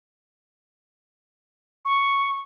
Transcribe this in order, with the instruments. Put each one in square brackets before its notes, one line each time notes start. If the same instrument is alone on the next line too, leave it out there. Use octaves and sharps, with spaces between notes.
[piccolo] C#6